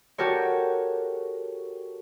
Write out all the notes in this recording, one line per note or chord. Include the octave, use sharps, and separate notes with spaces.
F#4 G4 A4 A#4 C#5